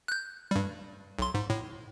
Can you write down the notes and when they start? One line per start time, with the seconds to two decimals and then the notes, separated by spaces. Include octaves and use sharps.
0.08 F#6 G6
0.51 G2 G3
1.19 B1 C6
1.34 G#2
1.50 A2